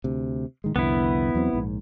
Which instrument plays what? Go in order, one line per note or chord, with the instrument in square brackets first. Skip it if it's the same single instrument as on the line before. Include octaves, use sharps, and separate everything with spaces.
[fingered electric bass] D2 C3
A2 D#3 G#3
[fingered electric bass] C2 F2 D3 [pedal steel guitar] B3 E4
[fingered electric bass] E2 F#3 C4
A#1 G#2